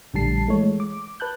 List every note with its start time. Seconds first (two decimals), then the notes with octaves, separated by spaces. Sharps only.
0.13 A#1 A2 D3 G3 A5 C7
0.48 E3 G#3 A3 C#5
0.80 D6
1.20 B4 A5 F#6 G6